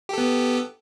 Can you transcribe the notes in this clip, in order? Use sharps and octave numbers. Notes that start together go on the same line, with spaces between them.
B3 G4 A4